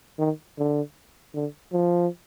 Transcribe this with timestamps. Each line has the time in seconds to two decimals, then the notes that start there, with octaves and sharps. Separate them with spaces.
0.19 D#3
0.58 D3
1.34 D3
1.73 F3